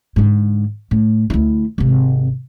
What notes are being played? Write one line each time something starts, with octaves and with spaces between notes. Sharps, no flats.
G#2 D3
A2
D2 E4
G#1 C3